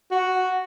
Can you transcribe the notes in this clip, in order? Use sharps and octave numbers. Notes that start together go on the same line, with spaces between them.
F#4